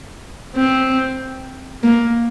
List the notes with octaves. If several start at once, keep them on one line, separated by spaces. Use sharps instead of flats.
C4
A#3